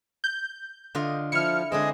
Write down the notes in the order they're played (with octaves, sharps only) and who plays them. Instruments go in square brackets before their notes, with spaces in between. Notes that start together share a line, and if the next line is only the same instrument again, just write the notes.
[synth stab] G6
[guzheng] D3 F4 D#5
[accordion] F3 [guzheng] E4 [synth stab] F6 C#7
[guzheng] D3 G#3 C4 [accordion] G#4 D#5